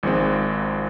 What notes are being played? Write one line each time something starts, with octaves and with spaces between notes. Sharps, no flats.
G#1 G#2 F3 G#3 C4